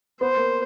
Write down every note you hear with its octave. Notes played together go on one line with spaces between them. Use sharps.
B3 C5
A#3